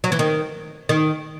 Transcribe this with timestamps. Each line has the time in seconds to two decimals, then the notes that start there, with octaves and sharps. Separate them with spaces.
0.04 F#3
0.12 E3
0.19 D#3
0.89 D#3